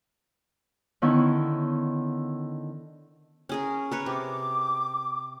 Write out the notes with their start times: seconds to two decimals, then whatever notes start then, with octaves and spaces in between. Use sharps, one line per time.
1.02 D3 D#3 B3 C#4 E4 C#6
3.49 C#4 G#4 A#4
3.91 A#4 B4 C#5
4.06 C3 D6